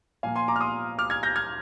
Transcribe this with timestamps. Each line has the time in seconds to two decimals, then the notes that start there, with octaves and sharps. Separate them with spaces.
0.23 A#2 F3 A#3 F5 G#5
0.36 G#5 C6
0.48 A#5 D6
0.56 F6
0.61 C6 D#6
0.98 D6 F6
1.10 F6 G#6
1.23 G6 A#6
1.36 F6 G#6